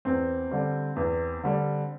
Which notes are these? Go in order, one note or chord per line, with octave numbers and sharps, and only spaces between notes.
E2 C4
D3 G3
E2
D3 G3